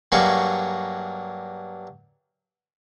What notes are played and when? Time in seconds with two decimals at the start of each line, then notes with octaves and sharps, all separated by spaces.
0.12 G2 F#3 A#3 E4 G#4 C#6